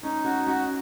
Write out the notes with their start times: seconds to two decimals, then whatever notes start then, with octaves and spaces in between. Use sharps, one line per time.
0.03 C#4 D#4
0.25 C#4 F#4
0.47 C#4 F#4